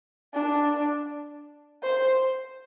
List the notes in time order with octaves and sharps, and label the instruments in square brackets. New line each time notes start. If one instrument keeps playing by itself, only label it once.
[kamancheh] D4
C5